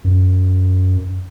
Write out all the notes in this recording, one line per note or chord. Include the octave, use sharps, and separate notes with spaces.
F#2